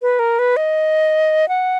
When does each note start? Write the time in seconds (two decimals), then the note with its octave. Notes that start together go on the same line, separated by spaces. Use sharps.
0.02 B4
0.19 A#4
0.39 B4
0.57 D#5
1.48 F#5